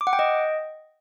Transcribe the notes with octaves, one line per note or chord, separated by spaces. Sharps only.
D6
F#5
G5
D#5